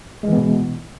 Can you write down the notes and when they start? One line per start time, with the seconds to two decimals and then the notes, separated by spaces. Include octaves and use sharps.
0.23 G#3
0.28 E3
0.32 B3
0.37 B2